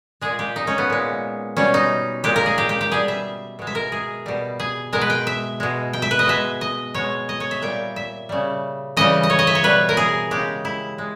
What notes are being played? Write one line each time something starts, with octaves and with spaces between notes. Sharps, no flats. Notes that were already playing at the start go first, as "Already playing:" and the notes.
A#2 G#3 G#4
G4
D#4
C#4
B3
A#2 G#3
B2 G3 C#4
D#4
A#2 G#3 G4
A#4
G#4
G4
G4
G4
B2 G3 G#4
E5
B2 G#3
E5
A#4
G#4
B2 G3
G#4
B2 G#3 A#4
B4
G5
E5
B2 G#3
G5
E5
B4
D#5
B2 G#3 E5
D#5
B2 G#3 C#5
D#5
C#5
E5
A#2 G3 G5
E5
C#3 G3
C#3 E3 G3 D#5
D#5
C#5
D#5
E5
C#5
B2 G3 B4
A#4
G#4
C#3 G#3 G4
E4
G#3